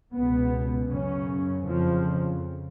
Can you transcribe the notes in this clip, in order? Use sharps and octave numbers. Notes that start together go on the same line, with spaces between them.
C#2 B2 B3
F#2 C#3 C#4
F2 C#3 F3